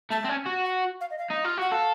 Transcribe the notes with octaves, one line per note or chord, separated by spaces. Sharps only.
A3 A5
C4
C#4
F#4
F#5
F5
D#5
F5
D#4
F4
F#4 F#5
A4 F5